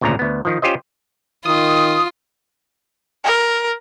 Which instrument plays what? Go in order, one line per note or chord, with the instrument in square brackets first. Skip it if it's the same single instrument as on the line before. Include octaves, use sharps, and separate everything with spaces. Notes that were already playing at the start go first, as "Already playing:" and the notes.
[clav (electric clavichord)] G#1 D2 A#2 C#3 A#5
D2 B3
D#3 F3
C#4 F4 G4 C5 D#5
[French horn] D#3 [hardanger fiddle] F4 [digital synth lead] D#6
[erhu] A#4